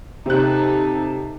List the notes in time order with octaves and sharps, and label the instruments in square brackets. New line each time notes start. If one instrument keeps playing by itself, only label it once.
[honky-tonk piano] C3 F#6 [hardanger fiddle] D#4 A4